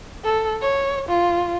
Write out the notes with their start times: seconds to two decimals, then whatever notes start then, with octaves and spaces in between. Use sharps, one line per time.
0.24 A4
0.62 C#5
1.09 F4